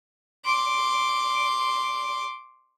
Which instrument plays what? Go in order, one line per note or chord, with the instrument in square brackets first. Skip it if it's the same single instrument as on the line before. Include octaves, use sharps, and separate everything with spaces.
[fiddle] C6 D6